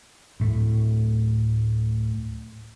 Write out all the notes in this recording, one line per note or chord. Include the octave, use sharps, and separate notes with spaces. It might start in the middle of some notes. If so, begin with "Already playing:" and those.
D2 A2 A3